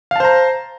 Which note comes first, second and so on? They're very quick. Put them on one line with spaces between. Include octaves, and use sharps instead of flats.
F5 A5 C5 A#5